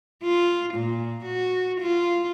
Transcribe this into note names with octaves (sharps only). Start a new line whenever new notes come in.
F4
A#2
F#4
F4